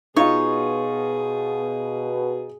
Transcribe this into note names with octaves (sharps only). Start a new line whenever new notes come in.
B2 D#4 F4 G#4 C#5